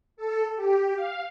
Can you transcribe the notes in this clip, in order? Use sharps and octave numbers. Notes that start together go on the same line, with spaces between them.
A4
G4
F5